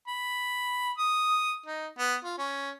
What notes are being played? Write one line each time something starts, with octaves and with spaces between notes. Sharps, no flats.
B5
D#6
D#4
B3
F4
C#4